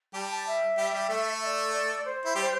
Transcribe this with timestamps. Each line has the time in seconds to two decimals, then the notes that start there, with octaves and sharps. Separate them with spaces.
0.14 G3 G4 A5
0.30 A5
0.46 E5
0.78 G3 G4
0.93 G3 G4
1.09 A3 A4
1.41 E5
1.44 D5
1.73 D5
2.05 C5
2.26 E4
2.36 G3 G4